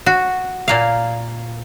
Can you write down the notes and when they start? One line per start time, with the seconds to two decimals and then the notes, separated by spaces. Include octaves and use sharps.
0.06 F#4
0.68 A#2 A#3 F5